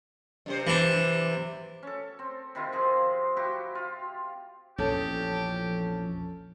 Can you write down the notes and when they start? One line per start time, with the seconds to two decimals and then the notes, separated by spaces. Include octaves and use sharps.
0.46 F#2 C3 C5
0.67 E3 D4
1.83 C#4 A4
2.19 C4
2.55 C3 D#3 E4 F4
2.72 F3 C4 G#4
3.37 E4 F#4 G4
3.75 F4
4.78 A#1 E2 F3 C#4 G4 A4